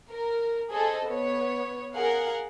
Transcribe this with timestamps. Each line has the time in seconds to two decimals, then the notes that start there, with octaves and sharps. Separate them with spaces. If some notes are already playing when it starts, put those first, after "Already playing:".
0.11 A#4
0.72 G#4 A4 C5 D#5
1.08 B3 C#5
1.95 G#4 A#4 F5 F#5